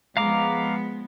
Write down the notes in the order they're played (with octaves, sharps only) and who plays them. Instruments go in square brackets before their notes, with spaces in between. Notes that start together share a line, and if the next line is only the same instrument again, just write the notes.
[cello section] F3 G#3 B3 [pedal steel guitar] F5 A#5 D6